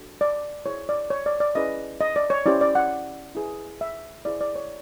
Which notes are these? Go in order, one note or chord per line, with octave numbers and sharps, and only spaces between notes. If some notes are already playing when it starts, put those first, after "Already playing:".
Already playing: D4 F#4 A4
D5
E4 G#4 C5 C#5
D5
C#5
D5
D5
C#4 E4 G#4 B4 D#5
D#5
D5
C#5
C#4 E4 G4 C5 D5
D5
F#5
E4 G#4 B4
E5
E4 G#4 C5 D5
D5
C#5